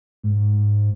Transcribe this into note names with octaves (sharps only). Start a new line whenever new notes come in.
G#2